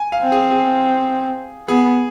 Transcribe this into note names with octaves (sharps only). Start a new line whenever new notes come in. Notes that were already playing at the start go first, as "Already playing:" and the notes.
Already playing: G#5
F5
C4
G#4
G#4
B3 G#4